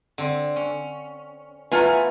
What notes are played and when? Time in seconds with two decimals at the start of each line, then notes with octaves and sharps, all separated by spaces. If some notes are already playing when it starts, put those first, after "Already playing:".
0.18 D3 C4
0.56 C#4
1.72 E3 A3 B3 F4 B4 G#5 A#5